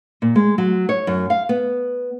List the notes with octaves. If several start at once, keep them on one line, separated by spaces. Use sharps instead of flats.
A#2
G#3
F#3
C#5
F#2
F5
B3